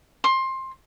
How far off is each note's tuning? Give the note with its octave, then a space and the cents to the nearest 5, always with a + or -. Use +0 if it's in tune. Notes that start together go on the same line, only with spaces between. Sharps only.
C6 +20